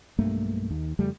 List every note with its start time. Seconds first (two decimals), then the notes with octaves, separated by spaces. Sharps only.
0.19 B1 G2 A3 A#3
0.71 D#2
0.99 F2 C#3 G3 A3